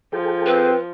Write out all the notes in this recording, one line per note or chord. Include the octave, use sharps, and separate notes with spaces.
F3 G#4 A4 G5
C4 B4